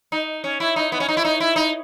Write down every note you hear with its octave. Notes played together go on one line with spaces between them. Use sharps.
D#4
C#4
E4
D#4
B3
C#4
D#4
E4
D#4
E4
D#4